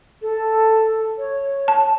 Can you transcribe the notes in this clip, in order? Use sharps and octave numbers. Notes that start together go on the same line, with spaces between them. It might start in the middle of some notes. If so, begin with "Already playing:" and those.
A4
C#5
A5